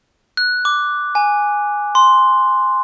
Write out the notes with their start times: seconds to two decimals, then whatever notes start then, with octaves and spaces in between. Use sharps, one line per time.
0.37 F#6
0.65 D6
1.15 G#5
1.95 C6